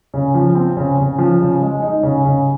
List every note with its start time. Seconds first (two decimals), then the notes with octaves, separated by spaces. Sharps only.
0.14 C#3
0.34 F3
0.55 C4
0.77 C#3
0.98 C#3
1.18 F3
1.40 C#3
1.62 G#3
1.82 D#4
2.03 C#3
2.25 C#3